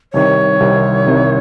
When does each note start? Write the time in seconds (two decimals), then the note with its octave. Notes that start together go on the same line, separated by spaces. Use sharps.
0.13 C2 C3 D#3 C#5
0.60 C2 C3 D#3
1.06 C2 C3 D#3